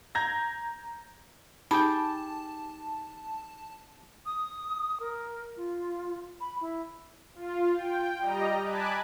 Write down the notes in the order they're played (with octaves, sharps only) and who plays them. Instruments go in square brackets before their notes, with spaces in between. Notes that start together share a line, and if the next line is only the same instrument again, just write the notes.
[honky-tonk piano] A#5 G6 G#6 A#6
[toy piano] D#4 [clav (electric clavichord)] G4 G#4 G5 [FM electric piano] A5 [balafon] B5
[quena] D#6
A#4
F4
B5
E4
[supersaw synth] F4
G5
G3 D#5 A#5
G#5 A5 B5 D6 F#6